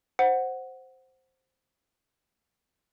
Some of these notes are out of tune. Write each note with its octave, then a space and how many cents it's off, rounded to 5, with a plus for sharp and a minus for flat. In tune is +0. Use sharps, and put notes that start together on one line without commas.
C5 +0 F#5 +0